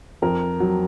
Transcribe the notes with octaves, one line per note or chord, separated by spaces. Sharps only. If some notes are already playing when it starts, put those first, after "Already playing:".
F2 A#4
F#3